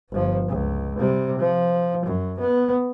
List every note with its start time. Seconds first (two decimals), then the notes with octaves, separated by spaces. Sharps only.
0.10 G1 F3
0.48 C#2
0.99 C3 G3
1.39 F3
2.05 F#2
2.40 B3